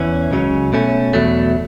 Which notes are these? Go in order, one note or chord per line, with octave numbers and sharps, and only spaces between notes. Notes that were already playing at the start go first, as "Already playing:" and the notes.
Already playing: E2 E3 C#4
C#2 C#3 F#3 C#4
B2 A3 C#4
E2 B2 F#3 A3